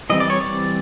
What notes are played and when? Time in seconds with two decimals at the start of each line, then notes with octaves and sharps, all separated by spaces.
0.10 E3 G3 C4 D#5
0.20 D5
0.30 C#5
0.41 D5